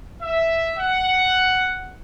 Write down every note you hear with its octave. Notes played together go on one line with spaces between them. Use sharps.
E5
F#5